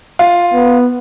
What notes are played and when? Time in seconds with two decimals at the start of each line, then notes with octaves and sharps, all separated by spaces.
0.19 F4
0.54 B3